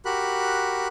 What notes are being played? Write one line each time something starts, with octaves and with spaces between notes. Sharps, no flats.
F#4 G4 A#4 B5 F#6